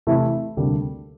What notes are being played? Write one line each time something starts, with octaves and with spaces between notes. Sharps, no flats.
C3 E3 A3 E4
D2 C3 G3 A#3 D4